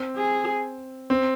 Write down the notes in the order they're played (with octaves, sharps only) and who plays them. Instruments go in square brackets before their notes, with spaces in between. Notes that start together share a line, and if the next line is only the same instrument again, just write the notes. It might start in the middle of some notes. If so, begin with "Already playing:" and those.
Already playing: [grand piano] C4
[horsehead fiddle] G#4
[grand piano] C4